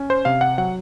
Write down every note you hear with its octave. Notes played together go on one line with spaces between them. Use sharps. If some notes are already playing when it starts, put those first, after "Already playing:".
Already playing: C#4
C5
C3 F5
F#5
F#3 F#5